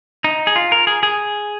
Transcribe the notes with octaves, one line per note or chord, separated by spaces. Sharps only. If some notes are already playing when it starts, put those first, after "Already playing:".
D#4
G#4
F4
A#4
G#4
G#4